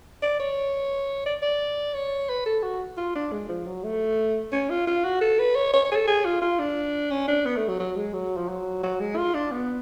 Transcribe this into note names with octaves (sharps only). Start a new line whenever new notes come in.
D5
C#5
D5
D5
C#5
B4
A4
F#4
F4
D4
G#3
F3
F#3
A3
C#4
F4
F4
F#4
A4
B4
C#5
C#5
C#5
G#4
A4
G#4
F4
F4
D4
C#4
D4
B3
A3
F#3
F#3
G#3
F#3
F3
F#3
F#3
G#3
F4
D4
B3